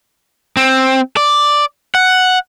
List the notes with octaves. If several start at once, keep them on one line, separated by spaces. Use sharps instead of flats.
C4
D5
F#5